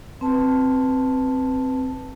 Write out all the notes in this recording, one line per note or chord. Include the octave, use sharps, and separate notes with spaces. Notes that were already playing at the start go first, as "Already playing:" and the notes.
C4 B4 A5